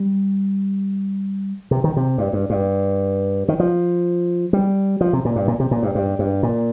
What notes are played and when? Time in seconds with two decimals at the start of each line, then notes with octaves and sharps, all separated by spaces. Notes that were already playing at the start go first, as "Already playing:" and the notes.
Already playing: G3
1.71 C3
1.84 D#3
1.97 C3
2.18 G2
2.33 G2
2.50 G2
3.48 D#3
3.60 F3
4.53 G3
5.01 F3
5.13 C3
5.25 A#2
5.36 G2
5.48 A#2
5.60 C3
5.71 A#2
5.83 G2
5.95 G2
6.19 G2
6.43 A#2